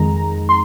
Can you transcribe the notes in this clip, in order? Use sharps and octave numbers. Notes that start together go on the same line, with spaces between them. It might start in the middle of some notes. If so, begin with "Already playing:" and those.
Already playing: F2 D#3 G#3 A#5
C6